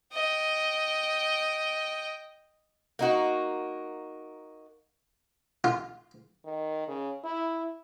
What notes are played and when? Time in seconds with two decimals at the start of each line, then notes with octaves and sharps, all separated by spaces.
0.13 D#5 G5
2.99 A#3 D#4 F#4
5.64 F4
6.45 D#3
6.88 C#3
7.24 E4